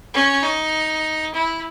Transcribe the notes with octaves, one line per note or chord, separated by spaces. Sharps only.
C#4
D#4
E4